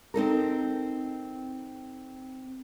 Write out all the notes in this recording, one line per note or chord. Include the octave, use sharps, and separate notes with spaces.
C4 D#4 A4 A#4